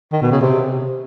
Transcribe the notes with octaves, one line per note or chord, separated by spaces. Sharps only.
D#3
B2
C#3
C3